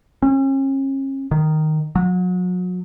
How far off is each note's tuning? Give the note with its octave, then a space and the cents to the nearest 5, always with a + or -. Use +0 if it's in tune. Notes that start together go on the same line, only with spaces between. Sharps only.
C#4 -40
D#3 -5
F#3 -35